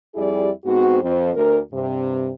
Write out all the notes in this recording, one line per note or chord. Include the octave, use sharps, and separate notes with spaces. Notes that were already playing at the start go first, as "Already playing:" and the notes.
F2 G3 E4 G4 G#4 D5
G#2 B3 C4 F#4
F2 C5
D2 A#4
G2 C3